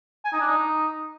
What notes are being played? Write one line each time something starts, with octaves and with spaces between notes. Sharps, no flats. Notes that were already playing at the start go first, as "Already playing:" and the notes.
G#5
D#4
D4
D#4